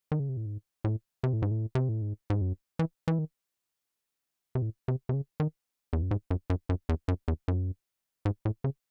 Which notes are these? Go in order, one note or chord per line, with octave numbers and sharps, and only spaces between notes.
D#3
C#3
C3
A2
G#2
A2
C3
A2
G#2
A2
C3
A2
G#2
G#2
F#2
E3
E3
D#3
C3
A2
C3
C3
C#3
D#3
E2
F#2
G#2
F#2
F#2
F#2
E2
F#2
E2
F#2
G#2
A2
C#3